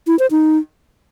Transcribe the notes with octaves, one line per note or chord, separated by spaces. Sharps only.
E4
C5
D#4